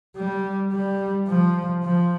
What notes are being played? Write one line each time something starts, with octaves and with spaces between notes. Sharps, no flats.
G3
G3
F3
F3